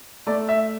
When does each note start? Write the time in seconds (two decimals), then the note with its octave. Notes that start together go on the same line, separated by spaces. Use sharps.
0.26 A3 D5
0.49 E5